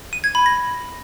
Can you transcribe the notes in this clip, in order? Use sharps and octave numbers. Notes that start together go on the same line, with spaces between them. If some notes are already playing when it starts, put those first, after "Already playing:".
D#7
G#6
B5
A#6